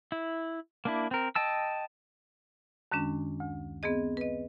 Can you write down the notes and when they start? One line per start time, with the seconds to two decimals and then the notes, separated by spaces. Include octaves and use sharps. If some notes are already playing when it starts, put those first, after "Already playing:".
0.12 E4
0.85 A#3 D4 E4
1.11 C4 A#4
1.35 D#5 G5 A5 E6
2.92 F#2 D#3 G#3 C#4 D4
3.40 D2
3.83 B3 C4 G#4 D#5
4.17 B4 D#5